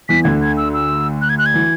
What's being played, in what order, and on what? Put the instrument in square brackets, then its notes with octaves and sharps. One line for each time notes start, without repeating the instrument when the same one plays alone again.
[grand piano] E2 E3 [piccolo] B6
[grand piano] D2 D3 [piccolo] G#6
[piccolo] G#6
E6
E6
F#6
G#6
F#6
G#6
[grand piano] E3